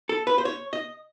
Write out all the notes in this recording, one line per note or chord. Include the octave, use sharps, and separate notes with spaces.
A4
B4
C5
C#5
D#5